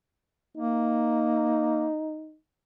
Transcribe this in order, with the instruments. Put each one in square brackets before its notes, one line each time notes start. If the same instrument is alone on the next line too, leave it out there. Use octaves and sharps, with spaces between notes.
[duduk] A#3 [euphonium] D#4